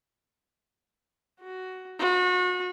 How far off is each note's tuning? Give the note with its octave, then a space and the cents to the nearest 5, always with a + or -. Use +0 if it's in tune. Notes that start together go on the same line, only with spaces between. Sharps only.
F#4 +10
F#4 -35